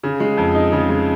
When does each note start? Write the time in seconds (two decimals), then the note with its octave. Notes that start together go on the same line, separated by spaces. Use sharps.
0.04 C#3
0.20 G#3
0.37 F2
0.55 D#4
0.72 C#3
0.89 G#3